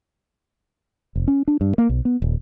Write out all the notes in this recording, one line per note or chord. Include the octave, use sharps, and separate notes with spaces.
F1
C#4
D4
G2
A#3
B1
B3
D#1